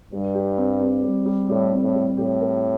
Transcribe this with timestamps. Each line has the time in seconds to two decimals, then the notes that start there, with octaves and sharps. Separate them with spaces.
0.11 G2 G3
0.34 G4
0.58 C4
0.80 C4
1.03 G3
1.25 G3
1.49 A2 G3
1.72 C4
1.83 A2
1.95 G3
2.17 A2 G4
2.40 A#4